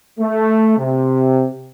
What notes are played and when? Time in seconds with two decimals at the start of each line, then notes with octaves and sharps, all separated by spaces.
0.20 A3
0.78 C3